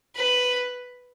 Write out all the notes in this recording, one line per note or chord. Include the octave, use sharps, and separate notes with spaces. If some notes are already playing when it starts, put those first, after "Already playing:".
B4